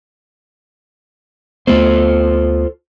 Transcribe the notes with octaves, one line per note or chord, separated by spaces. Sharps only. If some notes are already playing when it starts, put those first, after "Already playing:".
D2 A3 B3 F4 A4 C5